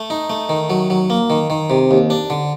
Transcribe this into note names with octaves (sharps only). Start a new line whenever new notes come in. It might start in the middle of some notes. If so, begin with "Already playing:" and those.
Already playing: A3
D#4
A3
D#3
F#3
F#3
A#3
D#3
D#3
C3
D#2
D4
D3